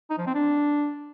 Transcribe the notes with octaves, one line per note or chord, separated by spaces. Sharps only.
D#4
F3
C4
D4